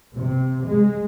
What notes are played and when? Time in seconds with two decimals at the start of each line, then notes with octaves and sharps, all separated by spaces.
0.16 C3
0.66 G#3